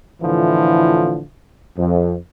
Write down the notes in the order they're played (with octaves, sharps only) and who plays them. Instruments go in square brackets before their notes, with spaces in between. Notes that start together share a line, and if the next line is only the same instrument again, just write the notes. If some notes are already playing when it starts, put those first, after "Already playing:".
[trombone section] A2 D3 E3 F3 E4 F4
F2